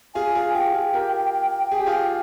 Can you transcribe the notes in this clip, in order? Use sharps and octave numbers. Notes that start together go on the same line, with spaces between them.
F4 G#4 G#5
F4 G#4
F4 G#4 G5
F4 G#4
G4 A#4
G#4
G4
F4 G#4